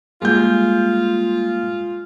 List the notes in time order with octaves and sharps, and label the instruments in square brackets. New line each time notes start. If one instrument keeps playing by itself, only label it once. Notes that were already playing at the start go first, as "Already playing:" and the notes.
[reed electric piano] G3 A#3 [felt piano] G#3 G6 [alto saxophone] F4